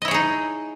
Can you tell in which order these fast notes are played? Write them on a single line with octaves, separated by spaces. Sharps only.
D#5 E4 C#5 G#4 D#4